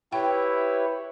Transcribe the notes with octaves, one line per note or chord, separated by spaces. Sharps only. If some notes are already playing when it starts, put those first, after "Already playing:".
E4 G4 B4 C#5 G5